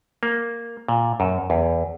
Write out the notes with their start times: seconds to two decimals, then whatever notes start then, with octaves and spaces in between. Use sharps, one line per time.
0.23 A#3
0.89 A#2
1.20 F#2
1.50 E2